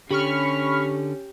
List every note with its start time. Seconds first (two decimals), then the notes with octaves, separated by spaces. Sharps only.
0.11 D3 C#4 G4 B5 C#6 F6